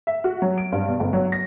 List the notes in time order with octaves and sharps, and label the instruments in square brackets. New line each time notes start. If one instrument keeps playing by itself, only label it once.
[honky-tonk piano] E5
F#4
F#3
D7
G2
B2
G1
F#3
A#6